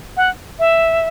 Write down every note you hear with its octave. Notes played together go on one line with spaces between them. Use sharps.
F#5
E5